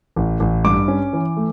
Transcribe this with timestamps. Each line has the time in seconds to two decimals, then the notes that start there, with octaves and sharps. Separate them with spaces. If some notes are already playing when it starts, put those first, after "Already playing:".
0.16 A1
0.40 A1
0.65 G2 D6
0.88 C#4
1.13 E3
1.37 A3